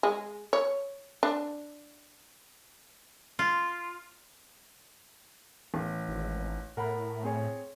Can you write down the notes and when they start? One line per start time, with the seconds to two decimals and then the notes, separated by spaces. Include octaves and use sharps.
0.03 G#3
0.53 C#5
1.23 D4
3.39 F4
5.74 A1
6.08 G#1
6.77 A2 A#4 F#5 B5
7.23 C4 G#4 C#5